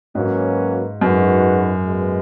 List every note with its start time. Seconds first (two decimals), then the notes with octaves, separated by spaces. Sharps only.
0.15 G#2 F#3 A#3 C#4 F#4 B4
1.01 F#2 G#3 D#4 F#4 B4
1.87 B2 G#3 B3